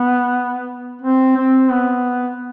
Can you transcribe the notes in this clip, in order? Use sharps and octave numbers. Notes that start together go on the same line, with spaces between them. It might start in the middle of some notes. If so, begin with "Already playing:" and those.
Already playing: B3
C4
C4
B3